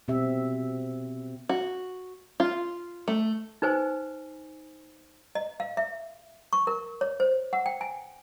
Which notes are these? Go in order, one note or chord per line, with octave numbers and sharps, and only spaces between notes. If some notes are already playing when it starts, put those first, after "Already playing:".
B2 C4 G4 E5
F#4
F4
A3
D#4 B4 C5 G#5
D#5
F5
E5
C#6
A#4
C#5
C5
F#5
G5
G#5